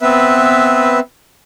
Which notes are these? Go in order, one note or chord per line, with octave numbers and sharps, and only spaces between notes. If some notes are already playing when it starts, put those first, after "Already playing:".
B3 C4 B4 E5